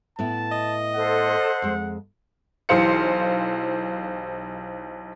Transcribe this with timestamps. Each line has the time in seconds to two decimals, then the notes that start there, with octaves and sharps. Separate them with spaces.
0.19 A2 B3 E4 A5
0.52 D#5
0.96 A4 C5 F#5
1.62 F2 G#3
2.69 B1 E3 G4 C5 F5 C#7